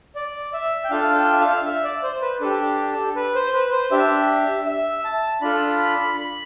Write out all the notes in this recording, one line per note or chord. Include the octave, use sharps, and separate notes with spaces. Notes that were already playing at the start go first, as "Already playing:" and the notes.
D5
E5
G5
D4 F4 A4 F5
G5
E5
F5
E5
D5
C5
B4
D4 G4 A4
B4
C5
B4
C5
D4 G4 E5
E5
A5
D4 F4 A4 B5
B5